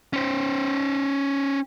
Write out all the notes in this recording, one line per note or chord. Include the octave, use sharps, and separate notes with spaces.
C#4 C5